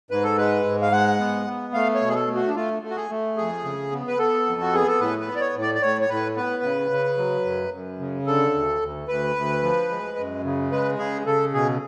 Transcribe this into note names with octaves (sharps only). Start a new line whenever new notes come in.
G#2 B4
A4
G#3 B4
G#2
F5
G#3 F#5
B3
B3
A3 F5
C#5
B2
G#4
A4
A3
F#4
D4
A3 F4
A3
F#4
G#4
A3
F2 G#4
C#3
B3
B4
B3 A4
F2
F#4
B3 G#4
A4
A2 B4
B4
B3
D5
C#5
A2
D5
D5
A2 C#5
C#5
A2 B4
B3 B4
C#3
C#3
F#3
F#2
F#2
C#3
D3 A4
D2
D2
D2 B4
D2
F3
G#3
F#2
C#3
G#3 B4
C#3 G#4
C#3 A4
B2 G#4